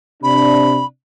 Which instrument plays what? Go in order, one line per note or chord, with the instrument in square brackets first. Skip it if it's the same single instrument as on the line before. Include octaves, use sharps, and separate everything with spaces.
[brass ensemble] C3 D4 [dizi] B5